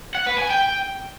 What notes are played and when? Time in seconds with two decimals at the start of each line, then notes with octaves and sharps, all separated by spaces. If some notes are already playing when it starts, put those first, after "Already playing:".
0.15 F#5
0.27 B4
0.39 G#5
0.50 G5